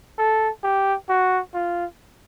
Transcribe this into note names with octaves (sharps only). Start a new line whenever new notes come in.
A4
G4
F#4
F4